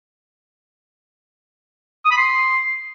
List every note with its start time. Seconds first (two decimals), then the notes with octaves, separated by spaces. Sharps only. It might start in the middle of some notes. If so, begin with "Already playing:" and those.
2.05 D#6
2.11 B5
2.17 C6